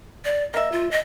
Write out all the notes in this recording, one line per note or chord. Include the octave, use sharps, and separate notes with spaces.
D5
A#3 D#5 E5
F4
D#5